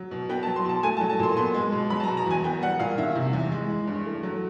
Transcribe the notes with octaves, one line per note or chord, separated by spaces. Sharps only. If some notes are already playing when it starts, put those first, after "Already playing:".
Already playing: F#3
B2
B3 G5
F#3 A5
C6
B2 A5
A3 G#5
A5
F#3
A5
A#2 C6
B3 C6
G#3
B2
F#3 B5
A5
A#5
B2
A#5
E2 G#5
B3 G5
G3 F#5
A#2 F5
D#3 E5
C3
E2
G#3
E3
G2
A3
F#3